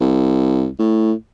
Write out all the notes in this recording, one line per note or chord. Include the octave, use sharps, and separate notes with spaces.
C2
A2